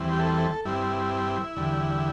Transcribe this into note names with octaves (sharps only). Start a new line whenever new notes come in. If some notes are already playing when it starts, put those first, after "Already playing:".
Already playing: E2 E3 G3 C4
G4
A4
G2 G3 C4 E4
E2 D3 G3